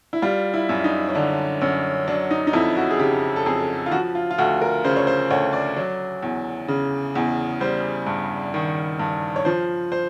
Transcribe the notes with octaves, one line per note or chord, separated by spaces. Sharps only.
E4
G3 F4
E4
F#2
D#4
C#4
D3 D4
F#2 C#4
F#3 D4
D#4
D#4
F2 E4
F#4
G#4
C#3 G4
A4
F2 G#4
F4
F3 F#4
F4
F4
D2 F#4
A#4
C#3 C5
C#5
C5
D2 C#5
D5
F#3
E2
C#3
E2
G3 C5
G2
D#3
G2
C#5
F3 C5
C5